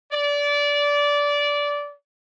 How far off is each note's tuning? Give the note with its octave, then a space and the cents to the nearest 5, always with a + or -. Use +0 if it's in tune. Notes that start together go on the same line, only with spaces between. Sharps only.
D5 -20